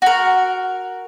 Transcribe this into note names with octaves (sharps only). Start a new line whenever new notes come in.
F#4 A#4